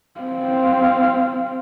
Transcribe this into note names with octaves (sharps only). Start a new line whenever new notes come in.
C4 F5